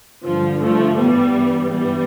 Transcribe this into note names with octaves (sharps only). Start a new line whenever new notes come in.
G2 D3 F3
F3 A3
G2 E3 G3 B3
G2 E3 G3 B3